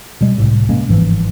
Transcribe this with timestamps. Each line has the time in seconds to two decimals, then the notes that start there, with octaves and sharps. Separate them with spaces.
0.21 B2 G3 G#3
0.38 C2 A2 C3
0.69 C3 G#3 A#3 C#4
0.88 G1 G#2 E3 F3